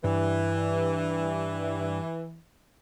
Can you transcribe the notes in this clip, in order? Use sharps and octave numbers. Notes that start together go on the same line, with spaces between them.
G2 E3